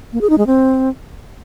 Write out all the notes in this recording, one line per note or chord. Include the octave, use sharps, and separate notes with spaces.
A#3
G#4
D#4
G#3
C4